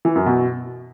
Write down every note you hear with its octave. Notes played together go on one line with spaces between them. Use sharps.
E3
F#2
B2